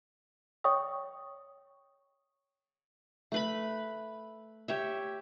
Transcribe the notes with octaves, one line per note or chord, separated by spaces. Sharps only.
C#5 G5 C#6 D#6
A3 B4 B5
G4 C#5 E5